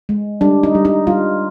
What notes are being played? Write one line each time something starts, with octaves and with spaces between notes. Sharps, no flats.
G#3
G3 D4
D#4
G3
D#4
G3 F4